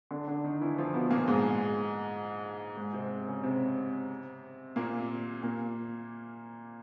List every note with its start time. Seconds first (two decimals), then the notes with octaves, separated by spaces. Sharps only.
0.11 D3 D4
0.28 D3 D4
0.44 D#3 D#4
0.61 E3 E4
0.78 F3 F4
0.94 B2 B3
1.10 A#2 A#3
1.27 G#2 G#3
2.76 G#2 G#3
2.93 C3 C4
3.27 C#3 C#4
3.43 C3 C4
4.76 A#2 A#3
5.42 A#2 A#3